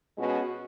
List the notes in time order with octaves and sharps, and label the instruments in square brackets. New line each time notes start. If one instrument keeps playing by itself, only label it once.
[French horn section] B2 G#3 C#4 F#4